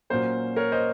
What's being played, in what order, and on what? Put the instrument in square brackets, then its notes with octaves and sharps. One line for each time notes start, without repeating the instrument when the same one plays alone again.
[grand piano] A#2 F#3 A#3 C#4 C5
A#4 C#5
C5 D#5